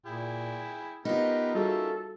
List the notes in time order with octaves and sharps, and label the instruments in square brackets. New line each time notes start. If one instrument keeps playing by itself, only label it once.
[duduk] A#2 [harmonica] E4 G#4 G5
[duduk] B3 [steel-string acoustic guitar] D#4 F4 [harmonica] G4 A#4 B4
[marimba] G3 F#4 G#4 [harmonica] A#3 C#4 E5 [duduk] A4